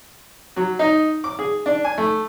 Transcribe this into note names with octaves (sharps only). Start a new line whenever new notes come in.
F#3
D#4
D6
G#4
D4
G#5
A3